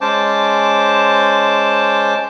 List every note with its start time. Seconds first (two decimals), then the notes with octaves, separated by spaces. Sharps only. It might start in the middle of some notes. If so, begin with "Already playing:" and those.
0.01 G#3 C#4 C5 A5 D6